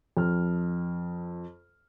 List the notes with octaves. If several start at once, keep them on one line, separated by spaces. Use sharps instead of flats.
F2 F6